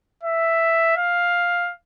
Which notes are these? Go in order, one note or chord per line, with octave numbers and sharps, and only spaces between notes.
E5
F5